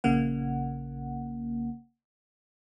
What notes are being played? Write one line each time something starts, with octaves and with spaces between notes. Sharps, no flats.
A#1 C#3 A#3 F#5